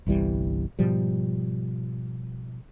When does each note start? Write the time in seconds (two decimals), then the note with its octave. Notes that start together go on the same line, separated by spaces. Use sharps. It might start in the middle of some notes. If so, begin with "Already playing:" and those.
0.06 G1 C2 E3 G3
0.79 G#2 B2 F3 G3